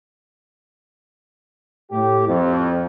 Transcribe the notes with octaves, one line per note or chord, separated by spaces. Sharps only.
A2 G4
F2